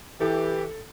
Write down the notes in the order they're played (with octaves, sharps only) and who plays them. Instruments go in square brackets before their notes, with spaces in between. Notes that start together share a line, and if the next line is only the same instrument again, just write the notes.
[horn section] E3 G4 [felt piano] A4